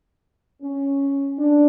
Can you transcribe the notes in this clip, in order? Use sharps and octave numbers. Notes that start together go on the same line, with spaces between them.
C#4
D4